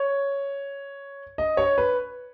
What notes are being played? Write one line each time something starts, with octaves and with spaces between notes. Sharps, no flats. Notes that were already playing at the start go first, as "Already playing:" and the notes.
Already playing: C#5
D#5
C#5
B4